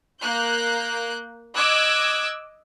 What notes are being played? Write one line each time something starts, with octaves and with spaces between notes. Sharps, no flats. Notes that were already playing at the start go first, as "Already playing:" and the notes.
A#3 F#6 G6
D#5 D6 E6 F#6 G#6